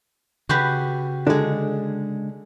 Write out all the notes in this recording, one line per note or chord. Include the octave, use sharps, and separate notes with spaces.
C#3 F#4 G4 B4
D3 G#3 D4